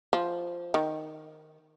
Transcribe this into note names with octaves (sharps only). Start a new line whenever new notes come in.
F3
D#3